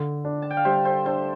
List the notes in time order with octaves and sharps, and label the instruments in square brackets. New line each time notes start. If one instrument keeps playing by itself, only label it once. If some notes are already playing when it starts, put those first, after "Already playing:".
Already playing: [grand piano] D3
D4
[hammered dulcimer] A5
G5
F5
[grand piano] G3 [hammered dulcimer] C5 E5
[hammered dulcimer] A4 C5
[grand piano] D4 [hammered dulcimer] A4 C5